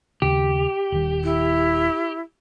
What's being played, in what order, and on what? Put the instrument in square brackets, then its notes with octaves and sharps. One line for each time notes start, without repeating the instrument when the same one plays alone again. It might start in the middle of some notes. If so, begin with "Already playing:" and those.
[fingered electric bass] D#2 C#3 [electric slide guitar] G4
[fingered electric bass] D#1 D#3
[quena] E4